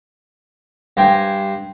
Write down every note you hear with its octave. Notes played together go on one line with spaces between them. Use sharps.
G2 C5 G5 G#5